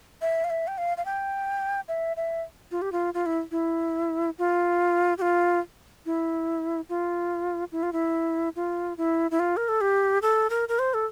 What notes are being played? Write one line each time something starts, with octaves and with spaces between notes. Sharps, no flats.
E5
F5
E5
G5
F5
F5
G5
E5
E5
F4
G4
F4
F4
E4
E4
F4
G4
F4
E4
F4
E4
F4
E4
F4
E4
E4
F4
A#4
A4
G4
A4
A#4
A#4
C5
A4